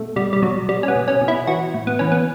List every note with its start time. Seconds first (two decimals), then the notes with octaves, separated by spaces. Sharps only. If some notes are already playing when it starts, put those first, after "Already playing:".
Already playing: B2 A3
0.16 B2 G3
0.33 G3
0.42 B2 F#3
0.68 B2 G3
0.83 C#4
0.88 B3
0.96 B2
1.08 C#4
1.21 B2
1.28 E4
1.47 E3 F#4
1.74 A2
1.87 B3
1.99 E3 C#4
2.12 B3